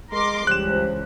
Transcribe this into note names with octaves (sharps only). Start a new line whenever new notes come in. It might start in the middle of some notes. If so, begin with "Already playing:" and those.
G#3 A#4 C6 D6
C#2 E3 G3 C#4 C5 F#6 E7